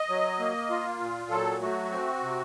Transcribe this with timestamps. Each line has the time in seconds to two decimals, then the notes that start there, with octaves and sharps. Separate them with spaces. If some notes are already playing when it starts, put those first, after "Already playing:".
Already playing: D#5
0.09 F#3
0.40 A#3
0.70 F4
1.00 A#2
1.30 F#3 A4
1.61 A3 F#4
1.91 C4
2.22 C3